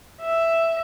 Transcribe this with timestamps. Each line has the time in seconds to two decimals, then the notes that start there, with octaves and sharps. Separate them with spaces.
0.21 E5